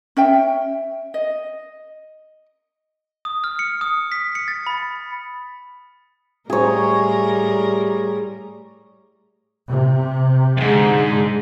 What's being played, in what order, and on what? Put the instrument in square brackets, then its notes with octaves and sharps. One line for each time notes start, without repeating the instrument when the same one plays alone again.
[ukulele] C#4 E5 G5
D#5
[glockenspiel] D#6
F6
C#7
D#6
B6
C#7
A6
B5
[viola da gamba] A2 G3 A#4 [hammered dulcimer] G#4 C#5
[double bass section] C3
[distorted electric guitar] F2 G#2 [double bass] D3 G#3